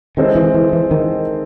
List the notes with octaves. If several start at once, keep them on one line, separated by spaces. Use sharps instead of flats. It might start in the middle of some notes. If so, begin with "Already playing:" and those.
D#3 G#3 C4 E4 A4 C5
E3
E3
E3
D#3